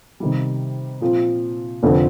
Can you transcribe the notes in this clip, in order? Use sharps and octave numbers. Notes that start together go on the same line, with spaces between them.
C3 D#3 G3
A#2 F3 C4
F1 F2 D3 F3 C4